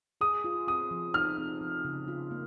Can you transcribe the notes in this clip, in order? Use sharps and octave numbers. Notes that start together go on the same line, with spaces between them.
G#4 D#6
F4
C4 D#6
F3
D#4 F6
C4
F3
C#3
F4
A#3